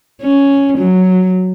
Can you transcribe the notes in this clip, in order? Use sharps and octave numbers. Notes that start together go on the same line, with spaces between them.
C#4
F#3